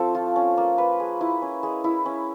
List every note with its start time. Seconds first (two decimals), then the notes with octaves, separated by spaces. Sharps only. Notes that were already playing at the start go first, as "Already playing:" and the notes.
Already playing: F3 A3 C4 A4
0.15 F4
0.36 C#4
0.57 A#3
0.78 B4
1.00 G#4
1.21 E4
1.42 C#4
1.63 G#3
1.84 E4
2.05 C#4